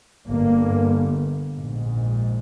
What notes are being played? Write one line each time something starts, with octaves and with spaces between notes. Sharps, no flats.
G1 G2 A#3
A#1 G#2